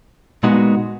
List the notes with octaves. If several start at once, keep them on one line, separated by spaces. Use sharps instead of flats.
A#2 G#3 B3 D#4 F#4